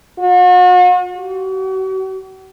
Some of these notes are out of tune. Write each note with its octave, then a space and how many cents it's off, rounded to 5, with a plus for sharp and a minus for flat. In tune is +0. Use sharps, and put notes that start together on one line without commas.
F#4 -45
F#4 +45